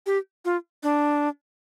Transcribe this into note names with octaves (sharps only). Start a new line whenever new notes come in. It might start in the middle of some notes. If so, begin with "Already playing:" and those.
G4
F4
D4